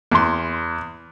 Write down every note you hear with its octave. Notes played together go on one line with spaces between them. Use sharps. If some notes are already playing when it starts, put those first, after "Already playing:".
E2 C6